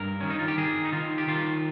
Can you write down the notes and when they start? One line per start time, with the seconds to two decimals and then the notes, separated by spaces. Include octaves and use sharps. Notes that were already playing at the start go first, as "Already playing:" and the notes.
Already playing: G2 A#4
0.20 D#3 C#4
0.30 D#4
0.39 F4
0.48 G4
0.57 D#3 G#4
0.84 D#4
0.92 D#3 F4
1.18 G4
1.28 D#3 F4